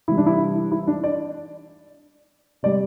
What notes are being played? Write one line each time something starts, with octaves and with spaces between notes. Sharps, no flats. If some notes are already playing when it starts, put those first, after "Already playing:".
C3 E3 G3 E4
D4
E4
E4
D4
D5
C3 G3 D5